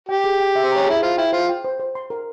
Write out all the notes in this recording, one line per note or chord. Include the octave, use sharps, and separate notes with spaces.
G4 G5
G#4
G5
E5
C4
C#4 A#5
E4 G#4
F4 C5
E4 G5
F4 C5
G5
C5
C5
C6
A#4